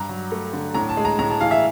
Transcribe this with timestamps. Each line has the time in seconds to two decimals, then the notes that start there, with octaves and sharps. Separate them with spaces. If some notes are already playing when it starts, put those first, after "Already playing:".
Already playing: G2 A#5
0.09 F#3
0.32 A3
0.53 D3
0.74 A2 A#5
0.89 A5
0.97 G#3
1.05 A#5
1.19 A2 A#5
1.30 A5
1.41 E3 F5
1.51 E5